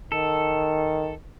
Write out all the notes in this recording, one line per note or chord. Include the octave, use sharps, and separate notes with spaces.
D#3 A4